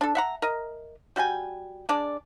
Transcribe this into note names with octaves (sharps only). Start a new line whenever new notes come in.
D4 A4
E5 F#5 A#5
A#4 D#5
G3 F#4 G5 G#5
G#3 D4 D5